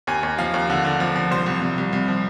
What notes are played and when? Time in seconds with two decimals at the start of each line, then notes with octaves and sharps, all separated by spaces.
0.07 D#2 G#5
0.23 D#2
0.38 F3 F5
0.54 D#2
0.70 D3
0.85 D3
1.00 F3
1.16 F3
1.31 C2 C5
1.46 C2
1.61 C2
1.78 C2
1.93 C2
2.08 F3